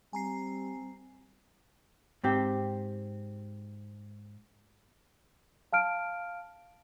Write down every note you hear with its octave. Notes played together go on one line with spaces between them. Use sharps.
G3 C4 G#5 A#5 C7
G#2 C4 G4
F5 A5 F6 D7